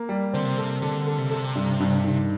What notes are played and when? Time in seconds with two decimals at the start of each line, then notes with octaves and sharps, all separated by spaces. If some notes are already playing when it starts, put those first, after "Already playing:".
Already playing: A#3
0.09 G3
0.33 D3 C4
0.45 C3
0.58 A4
0.82 D3 A4
1.07 A4
1.18 C3
1.31 A4
1.55 G2
1.80 G2
2.04 D#3